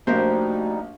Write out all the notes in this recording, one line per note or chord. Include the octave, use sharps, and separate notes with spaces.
A#1 G3 A3 D#4 F#4 G4 A#4 C5